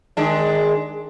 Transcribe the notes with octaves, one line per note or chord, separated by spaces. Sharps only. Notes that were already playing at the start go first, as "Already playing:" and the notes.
D#3 G#3 D4